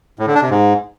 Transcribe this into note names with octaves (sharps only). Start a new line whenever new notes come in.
A2
D3
D4
C3
G#2